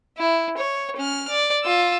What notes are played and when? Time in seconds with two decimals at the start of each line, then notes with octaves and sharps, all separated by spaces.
0.17 E4
0.58 C#5
0.96 C#4 F6
1.29 D5
1.63 F4 E6